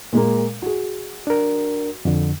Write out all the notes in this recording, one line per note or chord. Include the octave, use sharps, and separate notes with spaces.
A#2 G#3 A#3
F#4 G#4
D4 A#4
F2 D3